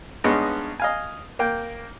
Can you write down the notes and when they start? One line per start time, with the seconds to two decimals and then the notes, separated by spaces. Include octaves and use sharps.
0.24 G2 G#3 B3 C#4 D#4
0.80 D#5 F5 G#5
1.39 A#3 G5